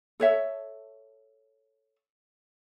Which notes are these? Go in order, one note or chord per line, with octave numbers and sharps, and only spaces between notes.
A4 C#5 E5